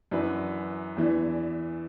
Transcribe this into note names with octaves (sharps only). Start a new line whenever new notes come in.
F#2 E3 D4 F#4 B4
E2 E3 D4